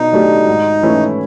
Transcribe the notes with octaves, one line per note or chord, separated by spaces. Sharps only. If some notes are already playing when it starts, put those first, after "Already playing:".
Already playing: B2 F#3 D4 D#4
F#3 A3 D4 G4
G#2
E3 A3 C#4 E4